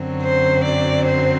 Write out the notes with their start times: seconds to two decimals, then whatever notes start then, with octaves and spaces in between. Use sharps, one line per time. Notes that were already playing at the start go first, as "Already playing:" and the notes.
Already playing: F#2 D3 F#3 C4
0.22 C5
0.63 D5
1.05 C5